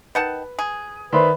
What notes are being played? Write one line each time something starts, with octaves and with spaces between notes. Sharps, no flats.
D#3 B4 F#5 A5
G#4
D#3 B4 C5 D5 E5 B5 C6